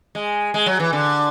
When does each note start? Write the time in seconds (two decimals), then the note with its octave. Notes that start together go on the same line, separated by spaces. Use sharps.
0.15 G#3
0.54 G#3
0.66 F#3
0.80 E3
0.93 D3